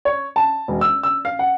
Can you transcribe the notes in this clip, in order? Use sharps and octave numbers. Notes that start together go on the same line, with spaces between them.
C#5
A5
E1
E6
E6
F5
F#5